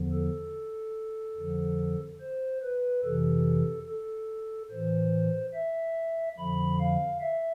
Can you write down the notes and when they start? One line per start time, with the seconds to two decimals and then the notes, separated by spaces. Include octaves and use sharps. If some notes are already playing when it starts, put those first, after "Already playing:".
Already playing: E2 D3 F3
0.13 A4
1.37 F2 D3 F3
2.21 C5
2.63 B4
3.04 F2 C3 E3 A4
3.87 A4
4.71 A2 E3 C5
5.54 E5
6.38 F2 D3 F3 B5
6.80 F5
7.22 E5